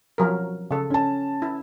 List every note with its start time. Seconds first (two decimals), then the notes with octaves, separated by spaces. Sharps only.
0.18 F3 F#3 A#4
0.71 C#3 A4
0.90 C#4 A5
1.42 E4